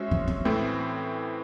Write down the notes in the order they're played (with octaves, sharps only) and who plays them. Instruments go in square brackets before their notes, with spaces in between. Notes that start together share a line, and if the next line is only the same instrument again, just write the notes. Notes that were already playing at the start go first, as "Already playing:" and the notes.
Already playing: [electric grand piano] G#3 C#4 F#4 C5 E5
[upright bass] E3
C4
[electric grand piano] A2 E3 C4 [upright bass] A3